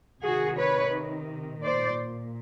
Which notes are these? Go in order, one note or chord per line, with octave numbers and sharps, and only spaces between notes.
C3 D#3 F#4 G#4
B4 C#5
A#2 C5 D5